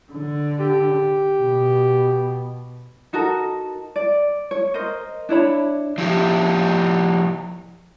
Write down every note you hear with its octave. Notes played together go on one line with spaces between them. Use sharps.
D3
G4
B2
D#4 F#4 A4 A#4
D5
C#5
A#4 C5 D#5
D4 E4 C#5 B5
F3 E4 G4